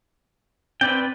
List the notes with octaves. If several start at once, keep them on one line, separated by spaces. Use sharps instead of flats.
C4 B4 D5 G5